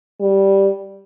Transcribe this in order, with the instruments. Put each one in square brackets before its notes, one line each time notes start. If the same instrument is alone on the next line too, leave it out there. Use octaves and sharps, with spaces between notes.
[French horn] G3